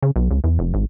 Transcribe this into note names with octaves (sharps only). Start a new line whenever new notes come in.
C#3
B1
C#2
E2
F1
G#1